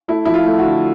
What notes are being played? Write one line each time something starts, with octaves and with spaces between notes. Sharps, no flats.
A3 E4
F3 E4
F4
A3
F#4
D3